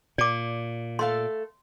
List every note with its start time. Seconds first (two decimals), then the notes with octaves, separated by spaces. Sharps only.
0.18 A#2 D5 D6
0.99 A3 A4 F5 C6